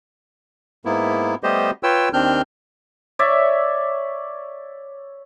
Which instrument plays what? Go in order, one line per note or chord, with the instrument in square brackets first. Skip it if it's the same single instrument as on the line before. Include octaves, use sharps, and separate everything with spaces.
[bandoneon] G#2 A#3 B3 E4
G3 A3 B3 G4 C5 D#5
F4 B4 C#5 G5 E6
D#2 D#3 C4 D4 F6 G6
[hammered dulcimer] C#5 D5 E5